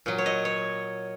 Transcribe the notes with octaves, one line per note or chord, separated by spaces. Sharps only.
A#2 F#3
C#5
D#5
C#5